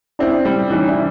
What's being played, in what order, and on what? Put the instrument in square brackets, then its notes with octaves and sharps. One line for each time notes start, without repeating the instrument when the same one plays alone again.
[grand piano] C4 [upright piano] D4 E4
[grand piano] G3
[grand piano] E3 [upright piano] C#4 D#4
[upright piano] D4 E4